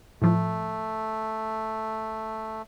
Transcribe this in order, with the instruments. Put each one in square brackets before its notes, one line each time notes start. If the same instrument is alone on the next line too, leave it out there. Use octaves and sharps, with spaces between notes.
[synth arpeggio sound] A2 F3 [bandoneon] A3